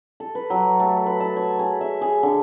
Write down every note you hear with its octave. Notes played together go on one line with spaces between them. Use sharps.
A4
B4
F#3
A3
B4
A5
C#5
G#4
E5
G#4
D3